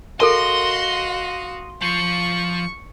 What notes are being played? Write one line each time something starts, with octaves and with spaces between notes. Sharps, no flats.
F#4 A4 A#4 D#5 F5 A5 C6
F3 C#6